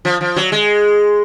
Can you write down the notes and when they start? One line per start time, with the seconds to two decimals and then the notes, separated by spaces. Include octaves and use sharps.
0.05 F3
0.21 F3
0.36 F#3
0.52 G#3